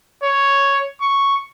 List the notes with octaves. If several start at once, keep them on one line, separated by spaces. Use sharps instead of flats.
C#5
C#6